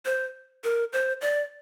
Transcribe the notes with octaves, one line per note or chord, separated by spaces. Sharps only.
C5
A#4
C5
D5